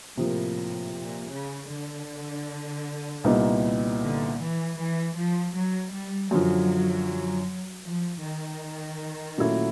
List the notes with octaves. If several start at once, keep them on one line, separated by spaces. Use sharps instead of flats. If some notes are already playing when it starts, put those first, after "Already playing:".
A2 C3 F3 A#3
A#2
C#3
D3
C2 A#2 G3 B3 D#4
D3
E3
E3
F3
F#3
G3
F#2 D3 F3 F#3
F3
D#3
A#2 F#3 A3 C#4 E4